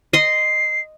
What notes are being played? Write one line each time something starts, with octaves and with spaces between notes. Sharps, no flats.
D#5 C6 C7